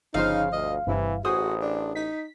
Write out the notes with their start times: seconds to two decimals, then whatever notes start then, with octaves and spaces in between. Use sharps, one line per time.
0.14 G1 C#3 F3 D#4 C5 F5
0.53 D2 D#5
0.87 G1 G2 C3 E3 E4
1.25 A1 F#4 G#4 C5 D#6
1.62 D4
1.95 D#4 B6